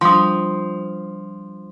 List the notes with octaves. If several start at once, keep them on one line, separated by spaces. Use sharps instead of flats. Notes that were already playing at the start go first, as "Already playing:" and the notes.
F3 G3 D4 C6 D#6